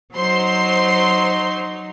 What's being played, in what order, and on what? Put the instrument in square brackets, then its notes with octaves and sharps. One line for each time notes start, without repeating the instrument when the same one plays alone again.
[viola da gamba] F#3 D#4 [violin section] C5 C6